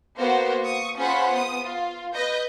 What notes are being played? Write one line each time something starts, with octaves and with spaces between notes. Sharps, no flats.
A#3 B3 F#4 C5
C#6 D#6
C#4 F4 G#4 C5 F#5 B5
B3 D#6
F4
B4 D#5 G6